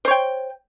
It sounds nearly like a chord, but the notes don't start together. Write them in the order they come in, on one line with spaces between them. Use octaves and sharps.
C5 C#5 G5